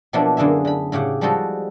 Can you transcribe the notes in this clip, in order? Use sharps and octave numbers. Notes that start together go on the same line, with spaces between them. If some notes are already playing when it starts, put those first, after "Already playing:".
B2 F3 F#3 A#3 D4 E4
F#2 D3 A#3 G#4 E5
D3 B5
A2 C#3 G4 F#5
F3 G3 G#3 D#4 F#4 A4